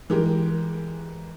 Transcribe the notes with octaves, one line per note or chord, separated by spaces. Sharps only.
E3 G#3 G4 A#4